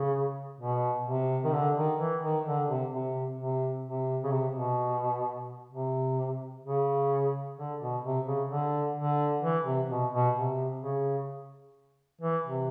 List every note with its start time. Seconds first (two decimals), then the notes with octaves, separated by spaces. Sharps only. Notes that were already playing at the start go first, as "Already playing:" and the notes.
Already playing: C#3
0.60 B2
1.06 C3
1.44 D#3
1.53 D3
1.76 D#3
1.99 E3
2.22 D#3
2.46 D3
2.69 C3
2.93 C3
3.38 C3
3.85 C3
4.23 C#3
4.31 C3
4.55 B2
5.72 C3
6.64 C#3
7.57 D3
7.81 B2
8.04 C3
8.26 C#3
8.49 D3
8.97 D3
9.42 E3
9.66 C3
9.89 B2
10.13 B2
10.35 C3
10.83 C#3
12.21 E3
12.44 C3